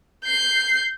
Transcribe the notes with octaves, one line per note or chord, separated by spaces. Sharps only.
G6 C7